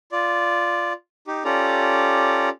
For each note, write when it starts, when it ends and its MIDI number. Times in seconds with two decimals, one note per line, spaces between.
0.12 0.93 65
0.12 0.93 74
1.27 1.43 63
1.27 1.43 67
1.45 2.49 61
1.45 2.49 65
1.45 2.49 67
1.45 2.49 69
1.45 2.49 74
1.45 2.49 82